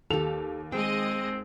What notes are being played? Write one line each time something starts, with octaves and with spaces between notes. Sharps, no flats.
D#2 G4 A4 F7
G#3 C4 D#5 G5